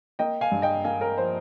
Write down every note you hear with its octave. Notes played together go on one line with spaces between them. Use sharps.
A#3 D#5 G5
F5 G#5
G2
D#5 G5
A#3 F5 G#5
A#4
F3 C5